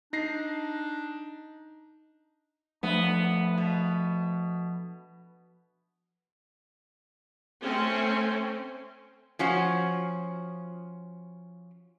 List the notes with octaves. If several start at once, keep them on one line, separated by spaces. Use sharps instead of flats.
D4 D#4 A#6 C7
F3 A3 B3 D4
B2
A3 C4 C#4
F3 C#4 F4 F#4